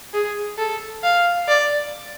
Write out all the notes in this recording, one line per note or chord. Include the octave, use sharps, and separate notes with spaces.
G#4
A4
F5
D5